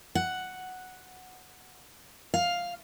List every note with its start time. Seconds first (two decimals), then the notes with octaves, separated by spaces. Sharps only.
0.15 F#5
2.34 F5